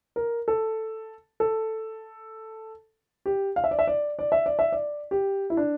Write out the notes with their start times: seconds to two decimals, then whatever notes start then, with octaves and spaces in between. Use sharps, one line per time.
0.16 A#4
0.48 A4
1.40 A4
3.26 G4
3.56 F5
3.64 E5
3.71 D5
3.79 E5
3.87 D5
4.19 D5
4.32 E5
4.46 D5
4.59 E5
4.72 D5
5.11 G4
5.50 E4
5.57 D4